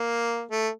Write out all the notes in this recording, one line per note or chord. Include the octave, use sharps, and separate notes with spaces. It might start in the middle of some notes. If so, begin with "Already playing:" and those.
Already playing: A#3
A3